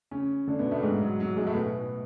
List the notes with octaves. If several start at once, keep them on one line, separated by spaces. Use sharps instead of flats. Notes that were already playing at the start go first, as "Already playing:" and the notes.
C#3 C#4
D3 D4
B2 B3
A2 A3
G#2 G#3
F#3
F#3
G#2 G#3
A2 A3
B2 B3